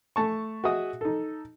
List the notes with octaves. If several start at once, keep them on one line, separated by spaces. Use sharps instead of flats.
A3 A5 C#6
F#4 G#4 D#5 E5 D#6
D#4 A4